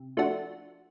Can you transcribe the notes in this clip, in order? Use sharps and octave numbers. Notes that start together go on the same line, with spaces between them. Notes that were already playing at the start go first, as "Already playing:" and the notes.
Already playing: C3
F3 A3 D4 F#4